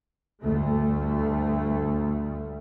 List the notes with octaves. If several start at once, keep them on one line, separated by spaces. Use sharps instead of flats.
D2 G2 A3